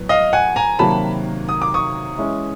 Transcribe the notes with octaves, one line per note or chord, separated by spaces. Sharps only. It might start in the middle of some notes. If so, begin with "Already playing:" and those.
Already playing: A2 F#3 B3
D#5 F5
F#5 G#5
G#5 A#5
C3 D#3 F#3 A#3 A5 B5
D#6
D6
C#6 D#6
E3 G#3 C#4 E4